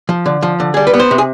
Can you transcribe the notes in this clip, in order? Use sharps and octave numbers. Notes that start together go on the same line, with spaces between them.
F3
D3
F3
D3
G3 G#4
B4
B3
C5
C3
G#4